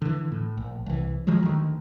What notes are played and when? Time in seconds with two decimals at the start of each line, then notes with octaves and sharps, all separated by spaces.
0.02 D3 E3
0.32 A2
0.57 A#1
0.86 C2 E3
1.27 D#3 F3 F#3 G#3
1.43 D2 D#3